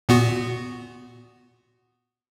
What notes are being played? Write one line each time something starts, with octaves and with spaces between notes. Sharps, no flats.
A#2 B3 F#4